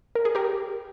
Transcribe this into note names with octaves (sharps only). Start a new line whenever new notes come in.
A#4
G#4
G4 A#4